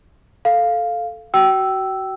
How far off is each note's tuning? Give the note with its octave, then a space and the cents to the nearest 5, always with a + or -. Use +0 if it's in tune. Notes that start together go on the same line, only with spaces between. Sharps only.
A4 -5 F5 +0
F#4 +25 G5 -25 E6 +0